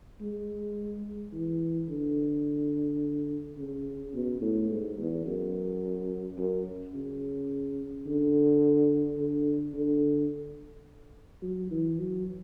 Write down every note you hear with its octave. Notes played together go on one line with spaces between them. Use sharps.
G#3
E3
D3
C#3
B2
A2
G#2
E2
F#2
F#2
C#3
D3
D3
D3
F#3
E3
F#3